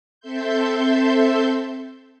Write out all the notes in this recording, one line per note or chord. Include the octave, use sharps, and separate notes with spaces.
C4 A4 E5 C6 G6